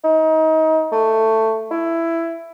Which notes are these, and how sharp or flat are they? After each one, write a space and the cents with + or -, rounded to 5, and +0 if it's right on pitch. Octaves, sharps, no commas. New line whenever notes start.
D#4 +30
A3 +15
E4 +10